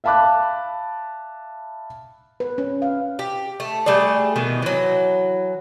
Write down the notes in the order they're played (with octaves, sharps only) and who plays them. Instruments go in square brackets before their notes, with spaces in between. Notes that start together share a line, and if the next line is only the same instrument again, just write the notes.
[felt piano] E5 F5 A5 B5 D6 F#6
[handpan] B4
C#4
F5
[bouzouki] G4
A3
G3 A3 G#4 D5
B2 D#3 E3 B3
E3 F#3